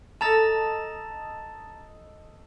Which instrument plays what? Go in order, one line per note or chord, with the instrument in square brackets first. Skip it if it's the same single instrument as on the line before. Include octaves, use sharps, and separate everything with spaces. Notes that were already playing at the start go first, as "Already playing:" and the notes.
[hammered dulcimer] A4 D#5 [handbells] A5 A#5 A6